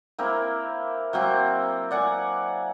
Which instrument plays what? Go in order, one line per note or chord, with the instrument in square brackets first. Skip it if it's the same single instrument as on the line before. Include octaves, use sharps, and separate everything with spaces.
[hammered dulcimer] A#3 C4 E4 A#4
F#3 A#3 C4
D5 F#5 G#5